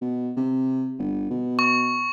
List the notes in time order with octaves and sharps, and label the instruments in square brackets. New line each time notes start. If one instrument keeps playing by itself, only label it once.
[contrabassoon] B2
C3
G1
B2
[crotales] C#6